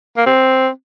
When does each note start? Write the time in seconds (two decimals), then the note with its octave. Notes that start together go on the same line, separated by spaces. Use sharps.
0.17 A#3
0.26 C4